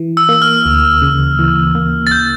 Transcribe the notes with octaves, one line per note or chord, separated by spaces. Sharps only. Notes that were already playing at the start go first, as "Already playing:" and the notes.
Already playing: E3
E6
A#3
F6
D2
C#3
E3
A#3
A6
G6